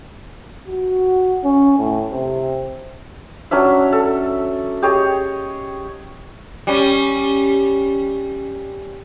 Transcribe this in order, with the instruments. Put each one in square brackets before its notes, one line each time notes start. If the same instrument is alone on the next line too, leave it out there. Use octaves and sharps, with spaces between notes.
[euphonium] F#4
C#4
A2
C3
[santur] F#3 C#4 D4 E5
A4
G4 G#4 C#5 D#5
[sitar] G3 C#4